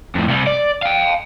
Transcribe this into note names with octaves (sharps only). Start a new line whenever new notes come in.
F2 A2
C3 G3
D5
F5 G5